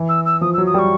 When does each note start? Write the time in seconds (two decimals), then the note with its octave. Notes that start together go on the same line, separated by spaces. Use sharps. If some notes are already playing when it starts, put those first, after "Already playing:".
Already playing: E3
0.09 E6
0.25 E6
0.41 F3 D#6
0.54 E6
0.58 F#3
0.67 D#6
0.74 G3 C#6